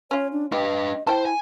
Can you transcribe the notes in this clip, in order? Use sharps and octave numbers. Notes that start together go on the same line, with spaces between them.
C#4 F4 C#5
D4
D4 G4 B4 D#5
E4 C5 G5 A5
G#5